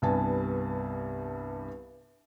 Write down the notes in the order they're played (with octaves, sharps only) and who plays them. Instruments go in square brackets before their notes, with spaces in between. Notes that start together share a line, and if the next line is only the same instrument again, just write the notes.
[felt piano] C2 G2 B3 G#5 A5